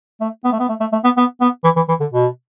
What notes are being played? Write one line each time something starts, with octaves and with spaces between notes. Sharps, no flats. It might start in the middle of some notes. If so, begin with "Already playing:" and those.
A3
B3
A3
B3
A3
A3
A3
B3
B3
B3
E3
E3
E3
D3
B2